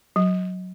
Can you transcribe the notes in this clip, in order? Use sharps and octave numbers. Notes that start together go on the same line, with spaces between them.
F#3